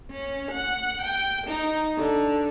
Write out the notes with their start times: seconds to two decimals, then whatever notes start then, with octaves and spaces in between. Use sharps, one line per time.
0.11 C#4
0.52 F#5
1.02 G5
1.47 D#4
1.98 D3